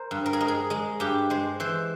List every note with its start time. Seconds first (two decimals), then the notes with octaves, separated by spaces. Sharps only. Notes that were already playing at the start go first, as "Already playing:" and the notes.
Already playing: A#4 C5
0.11 G2
0.26 A#4
0.33 G#4
0.40 G#3 A#4
0.48 G#4
0.70 G#3 G#4
1.00 G2 G4
1.30 G#3 C5
1.60 E3 C5